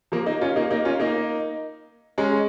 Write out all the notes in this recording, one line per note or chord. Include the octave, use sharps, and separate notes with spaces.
F3 A#3
A#3 D#4
C#4 F4
A#3 D#4
A#3 D#4
C#4 F4
A#3 D#4
G#3 C#4